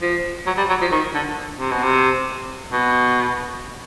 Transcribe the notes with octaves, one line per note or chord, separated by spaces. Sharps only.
F3
F#3
G3
F#3
F3
D#3
D3
C3
B2
C3
B2